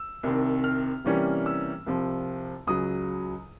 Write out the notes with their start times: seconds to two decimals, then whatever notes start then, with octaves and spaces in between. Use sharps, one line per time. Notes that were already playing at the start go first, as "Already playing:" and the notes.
Already playing: E6
0.23 C2 C3 D#3
0.64 F6
1.04 C3 E3 G3 A#3 C#4
1.46 E6
1.86 C2 C3 F3
2.67 C#2 C#3 F#3 D#6